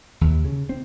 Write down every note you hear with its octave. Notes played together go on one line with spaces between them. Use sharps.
D#2
C#3
C4